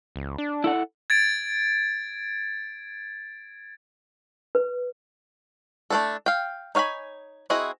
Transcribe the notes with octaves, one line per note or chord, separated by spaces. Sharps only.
C#2
D4
E4 A4 F#5
G#6 A6 D7
B4
A3 A#3 D4 E4 A4
F5 G5
D#4 C#5 F5 G#5 B5
C4 E4 F#4 G#4 D#5